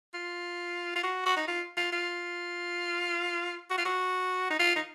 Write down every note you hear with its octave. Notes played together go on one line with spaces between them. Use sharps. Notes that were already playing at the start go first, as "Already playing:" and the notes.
F4
F4
F#4
F#4
D#4
F4
F4
F4
F#4
F4
F#4
D#4
F4
D#4